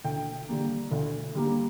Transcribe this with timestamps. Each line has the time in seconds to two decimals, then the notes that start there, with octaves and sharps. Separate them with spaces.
0.04 D2 G5
0.48 D3 G3 A#3
0.91 D2
1.35 D3 G3 A#3